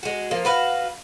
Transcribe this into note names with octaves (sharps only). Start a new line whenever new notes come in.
G#3 F#4
F3 A#3
F#4 B4 F5